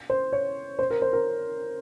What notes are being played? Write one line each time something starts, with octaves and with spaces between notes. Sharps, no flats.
C5
C#5
C5
A#4
C5
A#4